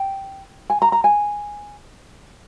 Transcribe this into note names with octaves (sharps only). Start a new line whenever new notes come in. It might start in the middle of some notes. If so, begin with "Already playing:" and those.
Already playing: G5
G#5
A#5
A#5
G#5